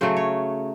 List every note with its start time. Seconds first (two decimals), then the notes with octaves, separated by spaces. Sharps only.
0.01 C#3 F#3 A3 C5
0.17 C#5